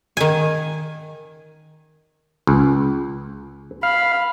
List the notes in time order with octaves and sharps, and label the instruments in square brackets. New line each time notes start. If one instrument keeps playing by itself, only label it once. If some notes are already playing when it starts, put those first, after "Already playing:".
[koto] D#3 G#5
[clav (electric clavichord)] C#2
[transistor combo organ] F5 [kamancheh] B5